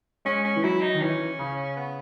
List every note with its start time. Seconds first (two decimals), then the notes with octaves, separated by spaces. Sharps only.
0.25 G#3 C#4
0.45 C#4
0.56 E3
0.63 F#3 E4
0.82 D#4
0.94 D#3
1.01 E3 C#4
1.39 C#3
1.76 B3